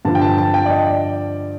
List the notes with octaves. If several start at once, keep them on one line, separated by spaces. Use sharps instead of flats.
G2 D3 F3 A5
G5
A5
A5
G5
D5
D#5
D5